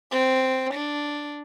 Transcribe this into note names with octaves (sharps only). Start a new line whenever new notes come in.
C4
D4